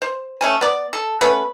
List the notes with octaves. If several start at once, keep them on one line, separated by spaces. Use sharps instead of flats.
C5
A3 C#4 G#5
B3 D5
A4
A3 B3 C#4 B4